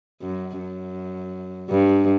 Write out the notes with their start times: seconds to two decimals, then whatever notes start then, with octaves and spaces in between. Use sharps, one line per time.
0.22 F#2
0.59 F#2
1.70 G2